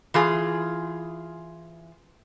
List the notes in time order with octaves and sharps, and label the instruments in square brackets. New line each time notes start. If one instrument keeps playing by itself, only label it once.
[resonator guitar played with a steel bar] E3 F4 G#4